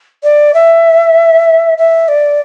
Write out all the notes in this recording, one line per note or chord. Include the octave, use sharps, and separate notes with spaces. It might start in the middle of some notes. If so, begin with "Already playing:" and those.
D5
E5
E5
D5